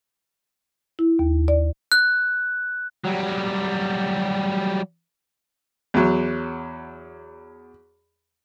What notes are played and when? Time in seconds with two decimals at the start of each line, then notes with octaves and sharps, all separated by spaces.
0.99 E4
1.19 D#2
1.48 D5
1.92 F#6
3.05 F#3 G3
5.94 E2 F#3